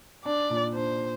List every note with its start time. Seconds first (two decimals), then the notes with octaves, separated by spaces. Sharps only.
0.25 D4 D5
0.50 A#2
0.75 D4 C5